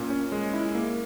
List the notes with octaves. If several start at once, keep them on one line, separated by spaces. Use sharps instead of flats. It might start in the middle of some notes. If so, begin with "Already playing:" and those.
Already playing: A#2 C#4
C#4
G#3
E4
A#3